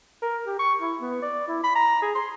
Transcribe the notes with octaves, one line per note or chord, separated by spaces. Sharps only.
A#4
G4
C#6
E4
B3
D5
E4
B5
A#5
G#4
C6